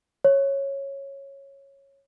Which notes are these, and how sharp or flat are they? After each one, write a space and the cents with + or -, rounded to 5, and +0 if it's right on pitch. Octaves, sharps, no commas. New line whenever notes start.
C#5 -10